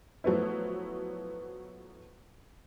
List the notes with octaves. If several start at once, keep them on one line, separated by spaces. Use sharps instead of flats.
F3 F#3 A3 B3 E4